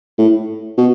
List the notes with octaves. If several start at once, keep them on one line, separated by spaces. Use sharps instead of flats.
A2
B2